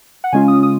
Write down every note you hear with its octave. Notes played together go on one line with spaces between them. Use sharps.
F#5
C#3 G#3 C#4 F4 G#5
D#6
D#6